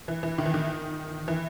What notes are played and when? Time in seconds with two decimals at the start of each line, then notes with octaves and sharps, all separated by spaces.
0.08 E3
0.23 E3
0.38 D#3
0.46 E3
0.54 D#3
1.28 E3